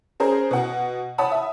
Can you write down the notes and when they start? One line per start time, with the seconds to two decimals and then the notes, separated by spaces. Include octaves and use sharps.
0.20 C#4 G#4 A#4 C5
0.51 B2 F#5
1.18 C#5 F#5 A5 B5 D#6
1.31 E5